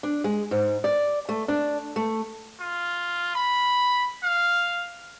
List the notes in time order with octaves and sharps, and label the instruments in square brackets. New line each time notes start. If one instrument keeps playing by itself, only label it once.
[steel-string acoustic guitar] D4
G#3
G#2
D5
A3
D4
A3
[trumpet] F4
B5
F5